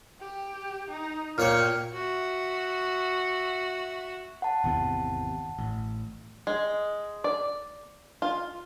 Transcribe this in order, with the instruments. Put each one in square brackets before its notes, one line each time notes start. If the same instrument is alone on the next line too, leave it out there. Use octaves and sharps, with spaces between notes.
[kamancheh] G4
D#4
[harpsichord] A#2 C#5 C#6 [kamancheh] A#3 G5 [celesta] F6
[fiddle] F#4 E5
[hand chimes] F#5 A5
[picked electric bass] G#1 E2 C3
A1
[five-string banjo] G#3
D5
F4